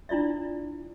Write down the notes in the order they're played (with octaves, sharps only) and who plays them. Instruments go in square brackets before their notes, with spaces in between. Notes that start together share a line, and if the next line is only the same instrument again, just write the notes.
[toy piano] D4 E4 F4 D5 E5